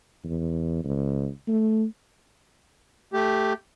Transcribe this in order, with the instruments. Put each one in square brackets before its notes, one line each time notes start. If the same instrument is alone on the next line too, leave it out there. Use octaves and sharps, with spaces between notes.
[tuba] E2
C#2
A3
[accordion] A3 G4